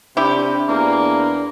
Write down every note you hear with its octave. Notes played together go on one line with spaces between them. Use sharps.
C3 D4 E4 G4
E2 A#3 D4